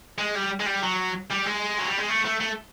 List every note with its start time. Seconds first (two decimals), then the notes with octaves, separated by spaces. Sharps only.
0.18 G#3
0.35 G3
0.60 G#3
0.66 G3
0.83 F#3
1.30 G3
1.46 G#3
1.79 F#3
1.88 G3
1.98 G#3
2.09 A3
2.25 A3
2.40 A3